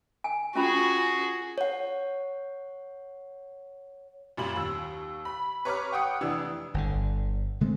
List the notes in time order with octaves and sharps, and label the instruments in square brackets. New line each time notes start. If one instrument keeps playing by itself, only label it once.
[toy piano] G#5
[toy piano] C#4 F4 B5 [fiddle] F#4 G#4
[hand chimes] C#5 F#5
[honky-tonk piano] F#2 A#2 G3 B5 F#7
D#2 E6
B5
B4 C#5 A#5 C#6 D6 F6
F#5 G5 D#6 C#7
F1 E3 D4 E6
[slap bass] G1 D3
D3 G#3 A3 C4